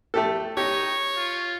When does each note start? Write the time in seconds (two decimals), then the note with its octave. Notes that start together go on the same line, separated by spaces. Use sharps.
0.14 A3 G4 A4
0.57 D#4 G4 C#5
1.17 F4